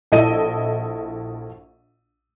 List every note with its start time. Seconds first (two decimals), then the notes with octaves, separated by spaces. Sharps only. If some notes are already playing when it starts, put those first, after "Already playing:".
0.12 A#1 E4 A4 D#5 D#7